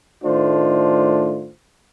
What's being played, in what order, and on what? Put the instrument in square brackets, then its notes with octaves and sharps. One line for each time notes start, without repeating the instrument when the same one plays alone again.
[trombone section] A2 D#3 A3 D4 F4 C5